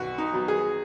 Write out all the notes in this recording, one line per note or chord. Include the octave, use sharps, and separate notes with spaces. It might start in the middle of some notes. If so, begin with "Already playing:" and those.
Already playing: B1 F#4
D#4
B2 F#3
G#4